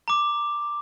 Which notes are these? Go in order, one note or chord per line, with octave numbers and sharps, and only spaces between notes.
A#5 D6